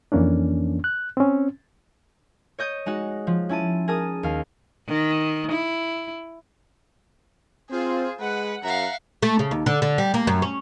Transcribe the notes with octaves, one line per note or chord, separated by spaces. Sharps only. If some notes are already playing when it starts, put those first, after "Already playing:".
F2 E3 A#3 C#4 D4
F#6
C4 C#4
C#5 D#5 G6 D#7
G#3 D#4 F#4 F#5
F3
C#4 E4 A5 D#7
G#4 A#4 A5 D#6
D#2 F5
D#3
E4
C4 F4 G#4 C5
G#3 B4 F#5
F#2 E5 F5 A#5
A3
C#3
D#2
D3
D3
G3
A#3
F#2
C#4